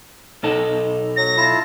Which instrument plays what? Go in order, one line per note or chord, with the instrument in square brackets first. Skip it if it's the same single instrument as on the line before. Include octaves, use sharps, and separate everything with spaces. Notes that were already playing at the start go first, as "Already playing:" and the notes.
[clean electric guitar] B1 D#4 A4
[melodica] F#3 [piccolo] A#6
[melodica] E4 F4 A5